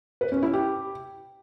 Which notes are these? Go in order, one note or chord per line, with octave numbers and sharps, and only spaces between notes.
B4
C#4
E4
G4